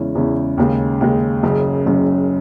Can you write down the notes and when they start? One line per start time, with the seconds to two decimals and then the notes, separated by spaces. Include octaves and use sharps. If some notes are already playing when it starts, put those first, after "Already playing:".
Already playing: E2 C#3 G#3 C#4 E4
0.15 E2 C#3 G#3 C#4 E4
0.58 D#2 C#3 G#3
1.01 D#2 C#3 G#3
1.43 F#1 F#2 C#3
1.86 F#1 F#2 C#3